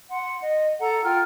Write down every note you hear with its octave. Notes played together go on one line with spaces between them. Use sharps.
F#5 C6
D#5
A4 F#5 A#5
F4 G5 F6